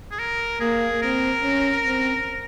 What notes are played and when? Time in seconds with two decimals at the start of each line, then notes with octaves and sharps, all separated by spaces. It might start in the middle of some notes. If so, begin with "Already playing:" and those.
0.12 G#4
0.19 A#4
0.61 A#3 G#4
1.02 C4 A#4
1.43 C#4
1.85 C4